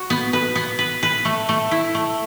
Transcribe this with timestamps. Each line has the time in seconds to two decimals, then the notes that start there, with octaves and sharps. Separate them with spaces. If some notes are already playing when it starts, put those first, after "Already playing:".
Already playing: F#4
0.10 B3
0.33 B4
0.55 B3
0.79 B4
1.03 B4
1.25 A3
1.49 A3
1.71 E4
1.95 A3